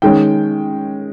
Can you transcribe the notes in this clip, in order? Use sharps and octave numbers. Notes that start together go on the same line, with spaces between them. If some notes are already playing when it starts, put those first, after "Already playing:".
D#3 G#3 C#4 G5